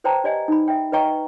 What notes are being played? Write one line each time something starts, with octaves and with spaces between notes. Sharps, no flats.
B4 C5 D5 G5 A5 A#5
G4 D5 D#5 G#5
D#4 B5
E5 G5
B4 D5 D#5 G5 A#5 C#6